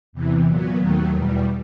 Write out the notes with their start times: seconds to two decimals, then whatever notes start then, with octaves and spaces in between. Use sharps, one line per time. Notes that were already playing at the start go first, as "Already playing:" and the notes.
0.13 E2 C3 E3
0.46 A#2 F#3 B3
0.78 D#2 D#3 F#3 A3
1.11 E2 B2 G3